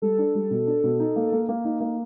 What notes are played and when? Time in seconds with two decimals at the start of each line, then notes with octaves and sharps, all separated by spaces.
0.02 G3 A4
0.18 D4
0.35 G3
0.51 B2
0.67 D4
0.84 B2
1.00 D#4
1.16 A#3
1.32 A#3
1.49 A#3
1.65 D#4
1.80 A#3